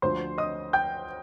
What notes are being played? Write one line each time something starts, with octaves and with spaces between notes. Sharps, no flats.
D2 D3 F3 C5 C6
D#5 D#6
G5 G6